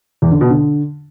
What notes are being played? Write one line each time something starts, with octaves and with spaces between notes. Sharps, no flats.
E2
D3
B2
D3